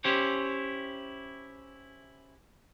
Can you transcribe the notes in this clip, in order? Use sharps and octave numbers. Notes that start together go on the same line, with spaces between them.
C#4 E4 G4 C5 C#5